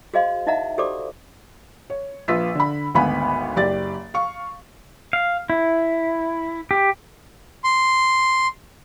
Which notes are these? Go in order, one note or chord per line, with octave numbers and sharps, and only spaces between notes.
F#4 G#4 C5 D#5 F5 C6
D#4 E4 D#5 E5 F#5 A#5
F#4 G4 A4 C5 D5 D6
C#5
A#1 F4 B4 F5 E6 B6
D3 B5
G#1 D2 B3 F5 G#5 B5
F#1 G4 D5 A6
F5 C#6
F5
E4
G4
C6